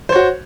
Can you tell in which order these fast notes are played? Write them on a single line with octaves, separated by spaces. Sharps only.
C5 C#5 F#4